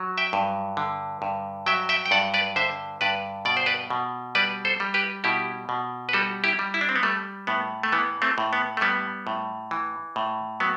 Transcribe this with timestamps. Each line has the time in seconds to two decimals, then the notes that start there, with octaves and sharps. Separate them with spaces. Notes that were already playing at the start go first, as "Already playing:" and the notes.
Already playing: F#3
0.18 E5 G5
0.33 G2
0.77 D3
1.22 G2
1.66 F#3 E5 G5
1.89 E5 G5
2.06 G5
2.11 G2 D5 F#5
2.34 B4 D5
2.56 D3 C5 E5
3.01 G2 B4 D5
3.45 B2 D5
3.57 C5
3.66 B4 D5
3.90 B2
4.35 G3 B4 D5
4.65 A4 C5
4.80 G3
4.94 G4 B4
5.24 B2 E4 G4
5.69 B2
6.09 B4
6.13 G3 F#4 A4
6.44 E4 G4
6.59 G3
6.74 E4
6.81 D4
6.89 C4
6.96 B3
7.03 G3 A3
7.47 A2 B3
7.83 A3
7.92 E3 B3
8.22 A3 C4
8.38 A2
8.53 B3
8.77 A3
8.81 G3 B3
9.27 A2
9.71 E3
10.16 A2
10.60 F#3 B3